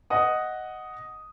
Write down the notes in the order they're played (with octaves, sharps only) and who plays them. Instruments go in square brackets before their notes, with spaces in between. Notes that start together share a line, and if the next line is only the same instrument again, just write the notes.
[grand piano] D#5 F#5 D#6